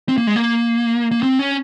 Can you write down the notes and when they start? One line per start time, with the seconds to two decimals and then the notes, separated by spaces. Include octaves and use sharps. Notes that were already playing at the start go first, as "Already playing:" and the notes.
0.09 C4
0.18 A#3
0.27 G#3
0.36 A#3
1.11 A#3
1.23 C4
1.39 C#4